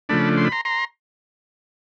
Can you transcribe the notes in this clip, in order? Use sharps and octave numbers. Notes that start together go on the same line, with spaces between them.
C#3 F3 A3 D4 A5 B5
C6
B5
A#5 C6
A#5 C6